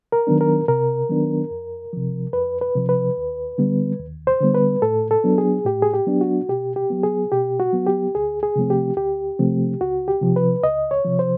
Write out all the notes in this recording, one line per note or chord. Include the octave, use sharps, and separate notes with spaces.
A#4
D#3 F#3 B3 D4
A#4
C3 A#4
D#3 F#3 B3 D4
F2
C3 F3
F2 B4
B4
C3 F3
B4
D#2
D3 G3 B3
D#2
C5
D3 G3 B3
B4
A2 A4
A4
F#3 B3 D4
G#4
A2 G4
G#4
G4
F#3 B3 D4
F#4
B2 G4
G4
F#3 B3
G#4
B2 G4
F#4
F#3 B3
G4
D2 G#4
G#4
C3 F3 A3 C4
G4
D2 G4
C3 F3 A3 C4
C#2 F#4
G4
C3 F3
B4
C#2 D#5
C#5
C3 F3
C5